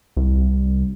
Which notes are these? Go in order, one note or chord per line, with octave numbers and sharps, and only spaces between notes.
C2